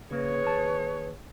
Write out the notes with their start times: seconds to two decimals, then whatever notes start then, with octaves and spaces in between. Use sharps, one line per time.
0.11 C#3 A#3 G#4 B4 C#5
0.44 D#2 A5